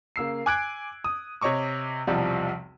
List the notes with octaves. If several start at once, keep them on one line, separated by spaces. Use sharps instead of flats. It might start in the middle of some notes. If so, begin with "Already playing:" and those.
C#3 A#3 E6 C7
G#5 D6 F#6 G#6 D7
D#6
C3 C#5 D#5 C#6 D6
B1 E2 C3 F3 G3